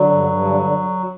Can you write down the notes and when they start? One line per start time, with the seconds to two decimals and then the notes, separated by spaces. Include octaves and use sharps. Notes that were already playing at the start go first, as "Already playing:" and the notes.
Already playing: D3 F#3
0.10 G2
0.28 G2
0.44 D3
0.61 D3